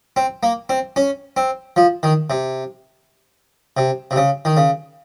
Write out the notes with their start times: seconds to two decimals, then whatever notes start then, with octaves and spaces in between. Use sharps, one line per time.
0.16 C4
0.43 A#3
0.69 C4
0.96 C#4
1.37 C4
1.76 F3
2.03 D#3
2.30 C3
3.77 C3
4.11 C3
4.16 C#3
4.45 D#3
4.57 C#3